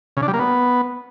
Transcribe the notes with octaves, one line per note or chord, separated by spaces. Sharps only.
C#3
D4
G3
A#3
B3